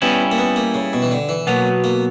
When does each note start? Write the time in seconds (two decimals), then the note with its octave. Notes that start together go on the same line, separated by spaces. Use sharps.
0.02 G3 B3 C#4 E4
0.32 A#3
0.38 B3
0.56 A#3
0.74 C#3
0.93 B2
1.02 E3
1.11 D3
1.29 E3
1.47 B2 F#3 A#3 B3
1.84 A#3